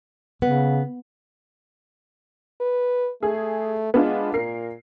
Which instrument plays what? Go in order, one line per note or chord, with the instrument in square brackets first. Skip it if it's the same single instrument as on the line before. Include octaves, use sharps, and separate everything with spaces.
[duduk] C#3 [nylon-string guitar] B3
[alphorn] B4
[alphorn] A3 [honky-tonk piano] G#4
[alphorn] G#3 [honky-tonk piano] B3 D4 F4
[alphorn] A#2 [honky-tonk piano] A#4 C7